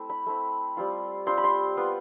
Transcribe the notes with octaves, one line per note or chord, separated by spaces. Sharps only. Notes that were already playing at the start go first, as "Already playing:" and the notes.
Already playing: A3 C4 E4
B5
A3 C4 E4
G3 C4 F4
G3 C4 F4 C6
B5
C6
B3 F4